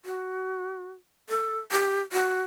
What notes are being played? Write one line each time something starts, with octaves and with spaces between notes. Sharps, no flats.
F#4
A4
G4
F#4